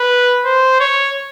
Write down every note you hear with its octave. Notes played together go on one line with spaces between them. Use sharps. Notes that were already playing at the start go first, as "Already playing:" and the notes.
Already playing: B4
C5
C#5